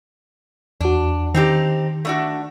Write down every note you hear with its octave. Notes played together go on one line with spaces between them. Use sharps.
E2 D4 F#4
D#3 C4 D#4 G4
A3 D4 F#4